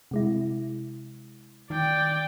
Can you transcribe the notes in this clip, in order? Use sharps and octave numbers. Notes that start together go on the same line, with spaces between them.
C3 G#3 E4
D#3 D5 G5